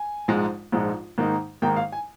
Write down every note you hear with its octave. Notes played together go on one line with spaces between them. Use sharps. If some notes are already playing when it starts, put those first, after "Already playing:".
Already playing: G#5
A#1 G#2 F3 G#3 D#4
A#1 G#2 F3 G#3 D#4
G#2 D#3 A#3 D#4
G#2 D#3 A#3 D#4 G5
F5
G#5